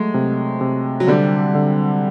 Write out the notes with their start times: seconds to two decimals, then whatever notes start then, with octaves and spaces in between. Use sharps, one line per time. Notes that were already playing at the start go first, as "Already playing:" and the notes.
Already playing: F#3 G#3 A3
0.14 C3
0.61 C3
1.00 F#3
1.07 D3 G3
1.55 D3